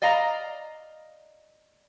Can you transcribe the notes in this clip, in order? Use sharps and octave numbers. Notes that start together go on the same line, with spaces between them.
D5 D#5 F5 A#5